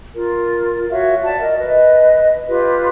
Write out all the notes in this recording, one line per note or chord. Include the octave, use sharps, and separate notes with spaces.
F4 A#4
F#4 C#5 E5 F5
D5 E5 F#5 A5
A#4 D#5
B4 D#5
F4 G4 B4